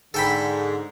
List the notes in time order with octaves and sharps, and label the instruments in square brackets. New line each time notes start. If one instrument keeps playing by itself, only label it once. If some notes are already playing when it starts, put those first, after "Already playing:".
[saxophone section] G#2 D3 [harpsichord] A4 G5 B5